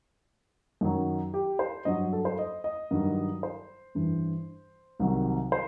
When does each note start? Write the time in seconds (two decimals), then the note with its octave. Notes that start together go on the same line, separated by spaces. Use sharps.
0.81 F#2 D#3 F#3
1.34 G4
1.59 C5
1.85 G2 F#3 D#5
2.13 A4
2.25 C5
2.39 D#5
2.64 D#5
2.91 G2 D#3 F#3
3.43 C5
3.95 G2 E3
5.00 C2 C3 D#3 F#3
5.52 C5